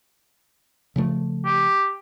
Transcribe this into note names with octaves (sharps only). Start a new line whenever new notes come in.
C#3 F3 A3
G4